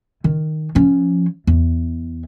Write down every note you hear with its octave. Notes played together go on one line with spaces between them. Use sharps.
D#3
F3 C#4
E2